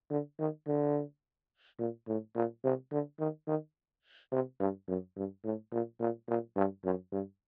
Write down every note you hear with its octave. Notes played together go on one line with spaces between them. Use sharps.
D3
D#3
D3
A#2
A2
A#2
C3
D3
D#3
D#3
C3
G2
F#2
G2
A2
A#2
A#2
A#2
G2
F#2
G2